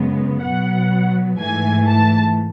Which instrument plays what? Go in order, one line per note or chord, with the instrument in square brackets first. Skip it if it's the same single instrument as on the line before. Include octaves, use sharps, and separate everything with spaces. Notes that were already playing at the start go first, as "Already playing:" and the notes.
Already playing: [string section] F#2 C#3 G#3 B3
B2 F#3 B3 F#5
G#2 E3 A3 G#5
A5